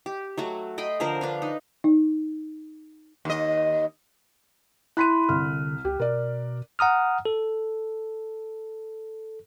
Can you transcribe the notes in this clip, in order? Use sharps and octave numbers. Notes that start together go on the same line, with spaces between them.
G4
F#3 A3 F#4
D#5 G5 B5 C6
D3 F3 A#4 C5
D4 B4 F5
D#4
D#4
D#2 D#5
E4 B5 C6 F#6 B6 D#7
C2 D3 F6
C#2 G4
B2 A#4 D5
F#5 A#5 D#6 F6
A4